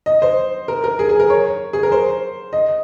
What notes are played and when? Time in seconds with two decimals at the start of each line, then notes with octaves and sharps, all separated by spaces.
0.06 D#5
0.22 C5
0.68 A#4
0.84 A#4
0.99 G#4
1.09 G#4
1.20 A#4
1.30 C#5
1.73 G#4
1.83 A#4
1.92 C5
2.53 D#5